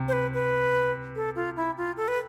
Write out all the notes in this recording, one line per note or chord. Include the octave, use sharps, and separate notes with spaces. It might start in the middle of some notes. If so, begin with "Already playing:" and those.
Already playing: C3
C5
B4
B4
A4
F4
E4
F4
A4
B4